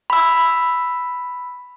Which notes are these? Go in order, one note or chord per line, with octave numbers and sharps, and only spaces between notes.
B5 E6